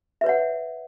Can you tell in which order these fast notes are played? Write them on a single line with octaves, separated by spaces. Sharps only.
E5 B4 C#5 F#5